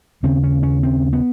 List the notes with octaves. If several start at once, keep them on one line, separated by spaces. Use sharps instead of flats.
D#2 C#3 C4
C#4
C#4
C4
B3